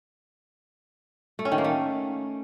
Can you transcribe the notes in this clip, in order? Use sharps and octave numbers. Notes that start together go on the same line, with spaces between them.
A3
C#4
D#3
A#3
A3